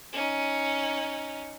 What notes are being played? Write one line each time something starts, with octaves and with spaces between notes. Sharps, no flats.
C#4 D#4